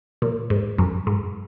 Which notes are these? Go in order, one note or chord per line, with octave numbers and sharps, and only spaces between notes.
A#2
G#2
F#2
G#2